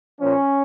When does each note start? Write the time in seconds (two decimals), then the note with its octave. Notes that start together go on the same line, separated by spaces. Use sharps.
0.20 A#2 F3 C#4